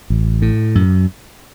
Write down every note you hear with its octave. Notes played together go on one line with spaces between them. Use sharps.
A1
A2
F#2